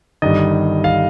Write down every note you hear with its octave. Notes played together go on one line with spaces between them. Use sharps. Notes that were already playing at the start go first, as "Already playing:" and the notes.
G1 G2 D#3 D#5
F5